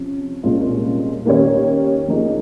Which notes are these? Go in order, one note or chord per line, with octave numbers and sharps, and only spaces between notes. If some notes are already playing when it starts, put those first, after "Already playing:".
Already playing: C3 F3 C#4
C2 A#2 G#3 C#4 F4
D#3 A#3 C#4 G4 C#5
F3 A#3 D#4 G#4